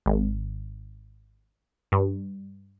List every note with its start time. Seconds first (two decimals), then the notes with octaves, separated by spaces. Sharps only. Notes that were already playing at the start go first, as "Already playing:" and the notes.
0.06 G#1
1.92 G2